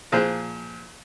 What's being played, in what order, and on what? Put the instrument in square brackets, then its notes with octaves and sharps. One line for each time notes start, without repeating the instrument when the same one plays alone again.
[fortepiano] A#2 F3 G#4 C5 F#6